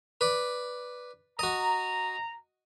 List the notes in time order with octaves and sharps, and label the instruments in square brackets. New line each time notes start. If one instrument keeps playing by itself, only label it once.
[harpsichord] B4 D5
[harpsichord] F#4 D#5 [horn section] A#5